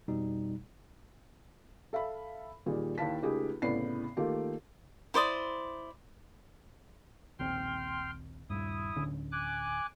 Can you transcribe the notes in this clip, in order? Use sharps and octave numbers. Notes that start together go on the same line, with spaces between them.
F2 B2 G3 D#4
A4 E5 F5 B5
A#2 D#3 G3 G#4
D#2 E4 F5 A5 B6
C#2 A3 D#4 G4 G#4
C2 A2 C#3 B3 D5 C7
D#3 A3 A#3 F4 G4
E4 C5 D5 D#6
A#1 D#2 C4 G5 C6 F6
D#1 G2 E4 D#6
D1 D3 C#4
G#5 D6 F#6